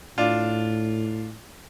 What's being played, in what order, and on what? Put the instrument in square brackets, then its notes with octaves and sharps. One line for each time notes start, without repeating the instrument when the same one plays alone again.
[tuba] A2 [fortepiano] D4 F4